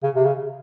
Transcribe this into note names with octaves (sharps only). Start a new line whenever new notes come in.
C#3
C3
C#3